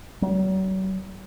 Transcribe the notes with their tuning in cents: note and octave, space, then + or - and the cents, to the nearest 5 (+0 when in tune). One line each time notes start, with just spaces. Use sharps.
F#3 +40